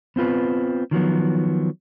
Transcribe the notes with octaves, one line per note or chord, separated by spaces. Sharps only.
B3 C4 F4 B4
D#3 F3 F#3 B3